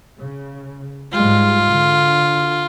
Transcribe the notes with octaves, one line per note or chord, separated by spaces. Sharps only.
C#3
G#2 G3 G#3 F4
D3